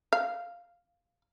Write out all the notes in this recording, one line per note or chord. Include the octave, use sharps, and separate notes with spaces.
F5